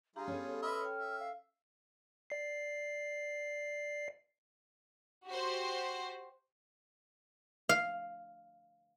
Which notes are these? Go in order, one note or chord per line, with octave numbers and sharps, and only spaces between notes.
G3 D4 F4 G4 G#4 F5 A#5
B3 C#4 G4 A4 C#5
B4 D#5 E5 B5 C6 F6
C#5 G5
E5
F5
D5 C7
F#4 G4 C5
F5